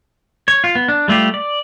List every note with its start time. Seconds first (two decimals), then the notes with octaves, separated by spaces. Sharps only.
0.48 C#5
0.64 F4
0.75 B3
0.88 D4
1.08 G3 A3 F4 G4
1.34 D5